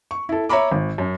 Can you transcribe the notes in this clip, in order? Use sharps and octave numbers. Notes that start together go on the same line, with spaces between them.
C#6
E4 A4
C#5 E5 A#5 B5 D6
G#1
F#2